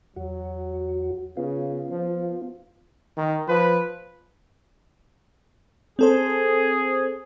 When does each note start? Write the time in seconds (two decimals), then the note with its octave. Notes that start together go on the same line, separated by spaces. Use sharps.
0.16 E2 F#3 F#4
1.37 C#3 B3 F4
1.91 F3
3.17 D#3
3.48 F3 B4
5.99 C4 G#4 A4 C5